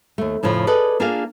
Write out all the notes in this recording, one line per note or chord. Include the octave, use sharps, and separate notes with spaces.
D#2 A3
F2 A2 C#3 F3
G#4 A4 B4 D5 D#5
A#3 D4 F4 G#4 A#4 F5